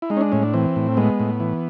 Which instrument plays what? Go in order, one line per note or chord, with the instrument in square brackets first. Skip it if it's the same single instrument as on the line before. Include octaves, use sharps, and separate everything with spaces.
[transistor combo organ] E4
G#3 D#4
C#4
D4
A2 C#4
D4
E3 C4
A2
G#3 B3
A2
E3